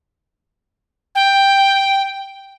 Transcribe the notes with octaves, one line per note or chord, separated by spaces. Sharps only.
G5